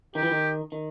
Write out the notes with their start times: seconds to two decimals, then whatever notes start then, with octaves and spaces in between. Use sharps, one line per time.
0.15 D#3 G4
0.23 E3
0.32 D#3
0.72 D#3